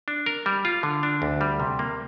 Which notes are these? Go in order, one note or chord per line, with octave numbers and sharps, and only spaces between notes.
D4
A#4
G3
F4
D3
D4
D2
G3
C3
A#3